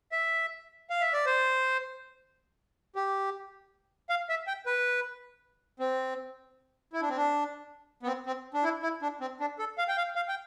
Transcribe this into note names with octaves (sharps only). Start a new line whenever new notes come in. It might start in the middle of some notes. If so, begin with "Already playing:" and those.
E5
F5
E5
D5
C5
G4
F5
E5
G5
B4
C4
E4
D4
C4
D4
B3
C4
C4
D4
E4
E4
D4
C4
D4
A4
F5
G5
F5
F5
G5